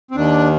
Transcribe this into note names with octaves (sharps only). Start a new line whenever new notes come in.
C4
D#2 D#3 D4